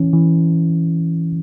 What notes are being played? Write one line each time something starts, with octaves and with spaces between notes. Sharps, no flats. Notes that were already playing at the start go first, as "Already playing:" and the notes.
Already playing: E3 C#4
E3